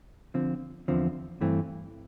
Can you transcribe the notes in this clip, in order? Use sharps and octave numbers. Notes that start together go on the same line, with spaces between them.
D3 F3 C4
E2 D3 F3 C4
G2 E3 A3 C4